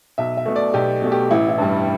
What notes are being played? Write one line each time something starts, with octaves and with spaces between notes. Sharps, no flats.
B1 E5
E5
B2 A3
D5
B1 G4
B2 A3
G4
A1 E4
E4
G2 G3